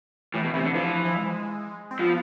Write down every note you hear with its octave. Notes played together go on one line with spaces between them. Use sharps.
A2 E3
B2
C3 E3
D3
E3 F3
F3
G#3
C4
F3 B3